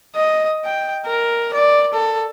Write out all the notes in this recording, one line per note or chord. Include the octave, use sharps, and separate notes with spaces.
D#5
G5
A#4
D5
A4